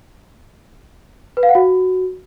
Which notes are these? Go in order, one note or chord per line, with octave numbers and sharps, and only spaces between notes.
B4
F5
F#5
F#4